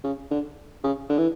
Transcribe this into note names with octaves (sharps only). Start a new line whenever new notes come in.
C#3
D3
C#3
D3
E3